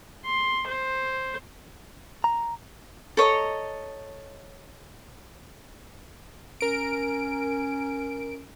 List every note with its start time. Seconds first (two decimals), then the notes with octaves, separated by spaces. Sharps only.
0.25 C6
0.67 C5
2.24 A#5
3.17 A4 C#5 D#5 A#5
6.61 C#4 A#4 D7